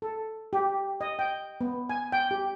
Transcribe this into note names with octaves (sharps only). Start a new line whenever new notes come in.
A4
G4
D#5
G5
B3
G#5
G5
G4